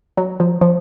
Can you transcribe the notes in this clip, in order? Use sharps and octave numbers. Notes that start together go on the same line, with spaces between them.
F#3
F3
F3